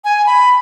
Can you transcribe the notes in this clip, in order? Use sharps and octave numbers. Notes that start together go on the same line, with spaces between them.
G#5
B5